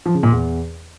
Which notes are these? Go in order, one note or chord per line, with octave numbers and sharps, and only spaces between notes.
F3
C#3
A#2
E2